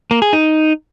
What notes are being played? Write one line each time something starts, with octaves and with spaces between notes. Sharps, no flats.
A#3
G#4
D#4